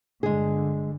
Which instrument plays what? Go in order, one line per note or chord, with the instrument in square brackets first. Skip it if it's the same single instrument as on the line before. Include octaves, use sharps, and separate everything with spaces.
[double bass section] G1 D3 [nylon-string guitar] G#3 G#4